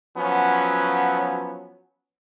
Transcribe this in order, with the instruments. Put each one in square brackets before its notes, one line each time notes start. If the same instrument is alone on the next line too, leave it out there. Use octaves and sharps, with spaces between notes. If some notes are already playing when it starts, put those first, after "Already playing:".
[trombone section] F3 F#3 B3 C#4